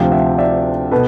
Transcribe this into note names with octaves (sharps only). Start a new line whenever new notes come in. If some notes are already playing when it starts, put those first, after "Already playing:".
Already playing: D2 C3 F3 F5 G5
E5 F#5
D5 E5
B2 A4 B4